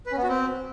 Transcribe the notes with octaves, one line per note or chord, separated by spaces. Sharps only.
B4
C#4
B3
F#4
C4